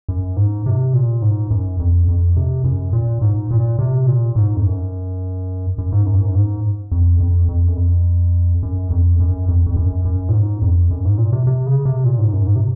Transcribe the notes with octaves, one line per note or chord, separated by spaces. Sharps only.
F#2
G#2
C3
A#2
G#2
F#2
F2
F2
C3
F#2
A#2
G#2
A#2
C3
A#2
G#2
F2
F#2
F#2
G#2
F#2
G#2
F#2
G#2
F2
F2
F2
F#2
F2
F#2
F2
F#2
F2
F2
F#2
F#2
A#2
G#2
F2
F#2
G#2
A#2
C3
C3
C#3
C3
A#2
G#2
F#2
G#2
C3